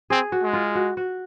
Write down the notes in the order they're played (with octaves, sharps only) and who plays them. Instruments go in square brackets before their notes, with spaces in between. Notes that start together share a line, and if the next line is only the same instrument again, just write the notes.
[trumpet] C4 [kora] G#4
[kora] F#4
[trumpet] G#3
[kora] F4
F#4
F#4